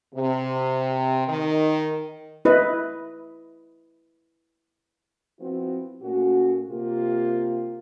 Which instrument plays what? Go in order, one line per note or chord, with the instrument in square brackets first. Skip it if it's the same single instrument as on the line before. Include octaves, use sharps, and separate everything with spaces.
[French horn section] C3
D#3
[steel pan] E4 B4 D#5
[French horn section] F3 B3 C4 E4 F#4
A#2 A3 C#4 F#4
C3 A#3 F4 G4